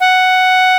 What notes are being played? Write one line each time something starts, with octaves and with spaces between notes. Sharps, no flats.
F#5